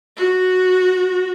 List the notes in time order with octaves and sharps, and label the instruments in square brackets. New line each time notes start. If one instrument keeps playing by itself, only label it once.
[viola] F#4